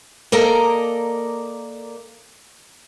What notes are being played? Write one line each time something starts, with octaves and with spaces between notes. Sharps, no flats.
A#3 A4 A#4 D5 D#5 A#5